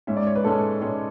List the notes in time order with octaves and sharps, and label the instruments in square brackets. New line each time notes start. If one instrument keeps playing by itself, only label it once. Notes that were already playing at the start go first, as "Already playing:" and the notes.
[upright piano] G#2 G#3 C#4 E5
D5
C#5
B4
G#2 G#3 C#4 A4
G#2 G#3 C#4